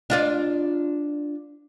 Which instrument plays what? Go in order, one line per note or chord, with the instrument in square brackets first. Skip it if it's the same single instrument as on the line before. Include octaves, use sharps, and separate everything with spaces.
[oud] D4 F4 D5